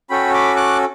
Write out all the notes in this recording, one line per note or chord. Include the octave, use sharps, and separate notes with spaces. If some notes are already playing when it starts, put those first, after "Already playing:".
C#4 F#4 A4 G5 B5
B5 D6
D6 F#6